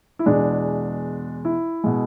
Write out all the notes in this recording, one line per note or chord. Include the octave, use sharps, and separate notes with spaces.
E4
E2 B2 G#3 D4
E4
B2 G#3